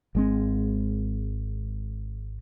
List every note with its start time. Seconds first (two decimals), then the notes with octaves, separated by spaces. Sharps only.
0.15 G#1 G#3 C4